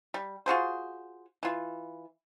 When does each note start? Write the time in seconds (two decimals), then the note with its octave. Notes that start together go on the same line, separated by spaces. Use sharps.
0.14 G3
0.46 F4 F#4 G#4 C5
1.43 E3 F4